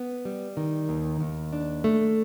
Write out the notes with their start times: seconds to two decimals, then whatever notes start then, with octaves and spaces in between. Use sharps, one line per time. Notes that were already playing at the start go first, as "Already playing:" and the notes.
Already playing: B3
0.25 G3
0.57 D#3
0.89 D#2
1.21 D#2
1.53 D4
1.84 A3